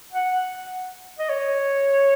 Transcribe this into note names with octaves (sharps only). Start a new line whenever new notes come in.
F#5
D#5
C#5